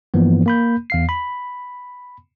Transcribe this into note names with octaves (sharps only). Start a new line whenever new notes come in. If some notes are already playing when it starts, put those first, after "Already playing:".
G2 E3 F3 A#3 B3
A#3 B5 G6
E2 F5 C7
B5